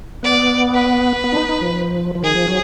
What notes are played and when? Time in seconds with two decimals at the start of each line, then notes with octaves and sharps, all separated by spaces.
0.23 B3 D5
0.74 B4
1.24 B3
1.32 D4
1.36 D#4
1.49 D#4
1.61 F3
2.15 F3
2.23 D#3 G#4
2.35 F3
2.48 F#3